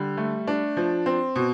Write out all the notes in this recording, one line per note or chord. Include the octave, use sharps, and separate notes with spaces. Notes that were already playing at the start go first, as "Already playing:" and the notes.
Already playing: D3 G3
A3
D4
F3
C4
B2